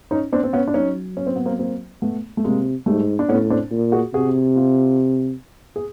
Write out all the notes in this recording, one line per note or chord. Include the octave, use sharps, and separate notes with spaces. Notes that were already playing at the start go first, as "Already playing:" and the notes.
C#4 D#4
C4 D4
C4
B3 C#4
D4
F#3 C#4 D#4
C#4
C4
B3
A#3 C4
A#3 C4
A3 B3
A3
C3 G#3 A#3
G#2 G3 A3
D4
A2 B3 C#4
C4 D4
A#2
F#4 G#4
C3 F#4 G#4
F4 G4
G#4